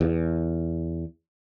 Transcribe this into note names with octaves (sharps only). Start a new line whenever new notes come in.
E2